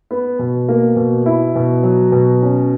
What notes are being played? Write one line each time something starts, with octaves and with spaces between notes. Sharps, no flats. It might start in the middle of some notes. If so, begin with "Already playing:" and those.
B3
B2
A#3
B2
E4
B2
F#3
B2
C#4